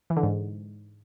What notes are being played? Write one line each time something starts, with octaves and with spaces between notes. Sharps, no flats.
E3
D3
G#2